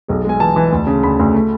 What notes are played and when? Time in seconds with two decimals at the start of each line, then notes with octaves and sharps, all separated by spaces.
0.08 B1 G#4
0.25 G#3 G#5
0.40 E3 A5
0.56 E3
0.72 D2
0.87 C#3
1.03 D2 B5
1.19 D2
1.34 A3